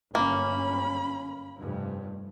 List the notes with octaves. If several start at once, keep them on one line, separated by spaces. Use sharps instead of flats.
G1 F#2 A#3 C#4 B5
F1 G2